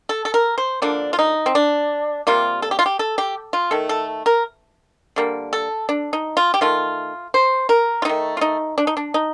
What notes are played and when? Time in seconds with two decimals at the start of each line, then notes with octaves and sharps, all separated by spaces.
0.09 A4
0.25 A4
0.34 A#4
0.58 C5
0.82 D3 F3 A#3 D4
1.13 F4
1.19 D#4
1.46 C4
1.55 D4
2.27 C3 G3 A#3 F4
2.62 A4
2.71 G4
2.79 F4
2.86 G4
2.99 A4
3.18 G4
3.53 F4
3.71 D#3 A3 A4
3.89 A4
4.26 A#4
5.16 D3 G3 A#3
5.53 A4
5.89 D4
6.13 D#4
6.37 F4
6.54 G4
6.61 D#3 A3 F4
7.34 C5
7.69 A#4
8.02 F4
8.05 D#3 A3 D#4
8.37 F4
8.41 D#4
8.78 D4
8.87 D#4
8.97 D4
9.14 D#4